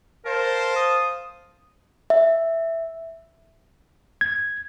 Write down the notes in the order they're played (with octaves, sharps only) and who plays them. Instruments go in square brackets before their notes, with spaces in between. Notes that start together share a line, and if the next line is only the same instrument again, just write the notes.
[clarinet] A#4 [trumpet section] C5 F5 A5
[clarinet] D#6
[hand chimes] E5
[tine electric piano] G#6